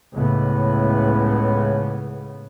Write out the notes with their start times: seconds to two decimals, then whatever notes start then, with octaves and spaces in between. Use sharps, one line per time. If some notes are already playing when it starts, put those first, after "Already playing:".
0.13 C#2 A2 C#3 B3